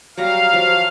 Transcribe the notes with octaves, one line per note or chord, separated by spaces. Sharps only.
F#3 G3 F5 A#5
F3 F#3